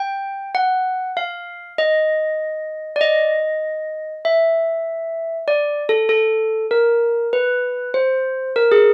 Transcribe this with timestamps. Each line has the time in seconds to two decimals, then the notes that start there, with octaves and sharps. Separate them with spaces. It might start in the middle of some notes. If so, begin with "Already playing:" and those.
Already playing: G5
0.55 F#5
1.17 F5
1.78 D#5
2.96 D5
3.01 D#5
4.25 E5
5.48 D5
5.89 A4
6.09 A4
6.71 A#4
7.33 B4
7.94 C5
8.56 A#4
8.72 G#4